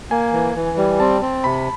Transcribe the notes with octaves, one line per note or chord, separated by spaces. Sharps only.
A#3 G#5
E3
E3
G3
C4 A5
C4
C3 B5